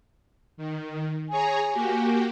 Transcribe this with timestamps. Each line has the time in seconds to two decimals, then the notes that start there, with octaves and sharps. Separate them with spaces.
0.57 D#3
1.30 G#4 C#5 G#5 A#5
1.73 A#3 F#4 G4